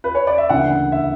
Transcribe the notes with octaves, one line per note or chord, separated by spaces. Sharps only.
B4
C#5
D5
E5
D2 C#3 E3 A#3 F#5
E5